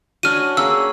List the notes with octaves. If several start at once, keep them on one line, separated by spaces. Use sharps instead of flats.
C#4 D4 F#4 F6 D#7
A#3 C#4 G#4 E6